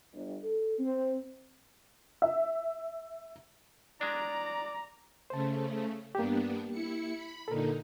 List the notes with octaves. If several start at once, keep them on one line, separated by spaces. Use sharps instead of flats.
G1
A4
C4
E5
G#3 D4 D5 A#5
C#3 A3 C5 A5
G2 A#3 B3 D4 G4
E4 C#7
B5
A#2 D3 D#4 A4 A#4